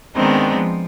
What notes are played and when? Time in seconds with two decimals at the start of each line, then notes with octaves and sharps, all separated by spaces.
0.15 D#3 G#3 B3 C4 D4 D#4
0.53 F3